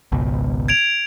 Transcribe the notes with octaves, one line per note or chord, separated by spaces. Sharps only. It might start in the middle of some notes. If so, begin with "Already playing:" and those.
G#1 C#2 B2
G#6 D7 F7